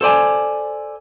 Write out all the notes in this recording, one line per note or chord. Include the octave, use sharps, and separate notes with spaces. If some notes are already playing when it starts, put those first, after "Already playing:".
A4 C5 D5 G#5